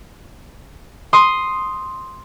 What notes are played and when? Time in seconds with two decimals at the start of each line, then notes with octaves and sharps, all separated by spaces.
1.13 C6 D#6